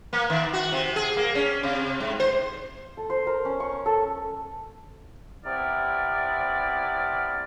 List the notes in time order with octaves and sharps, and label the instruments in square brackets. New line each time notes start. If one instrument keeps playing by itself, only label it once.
[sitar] A#3
D#3
F#4
C3
G#4
A#3
C#4
C3
G#2
C5
[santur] A4
C5
A#4
C#4
C#6
A4
[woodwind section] C3 B3 E4 D5 F6